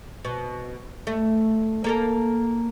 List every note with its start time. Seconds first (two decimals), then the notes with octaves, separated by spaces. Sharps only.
0.25 B2
1.07 A3
1.84 A#3 A4 A#4